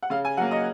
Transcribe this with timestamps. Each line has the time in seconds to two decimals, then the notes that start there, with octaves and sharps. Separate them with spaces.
0.03 F#5
0.10 C#3 F5
0.25 G#5
0.37 F#3 A#3 F#5
0.51 D#5